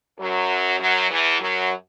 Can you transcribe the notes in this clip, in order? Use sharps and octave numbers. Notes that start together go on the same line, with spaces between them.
F#2 F#3
F#2 F#3
E2 E3
F#2 F#3